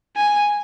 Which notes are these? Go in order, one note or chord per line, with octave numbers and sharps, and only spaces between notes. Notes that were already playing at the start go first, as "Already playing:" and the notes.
G#5